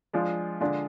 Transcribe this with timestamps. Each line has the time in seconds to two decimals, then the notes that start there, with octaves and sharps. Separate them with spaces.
0.13 F3 G#3 D4 F4
0.60 D3 G#3 D4 F4